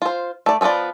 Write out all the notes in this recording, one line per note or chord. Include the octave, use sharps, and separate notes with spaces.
F4 C5
A3 D5
F3 A3 B3 F4 D5